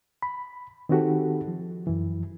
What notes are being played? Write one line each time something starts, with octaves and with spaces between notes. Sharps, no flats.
B5
D#3 C4 D#4 F#4 G4 A4
F3
F#2 E3